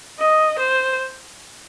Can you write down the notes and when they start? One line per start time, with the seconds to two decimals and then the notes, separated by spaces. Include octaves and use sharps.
0.19 D#5
0.59 C5